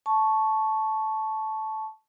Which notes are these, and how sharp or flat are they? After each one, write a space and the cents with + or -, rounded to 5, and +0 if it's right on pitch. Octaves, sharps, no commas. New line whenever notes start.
A5 -10 C#6 +0